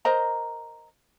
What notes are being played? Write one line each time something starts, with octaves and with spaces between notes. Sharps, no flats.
A#4 C5 D#5 A#5